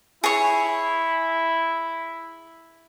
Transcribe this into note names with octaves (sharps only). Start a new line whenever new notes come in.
E4 G#4 C#5